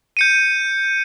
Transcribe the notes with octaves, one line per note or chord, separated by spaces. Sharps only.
G6 C#7 D#7